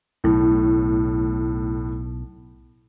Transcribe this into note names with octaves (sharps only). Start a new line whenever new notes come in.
B1 A2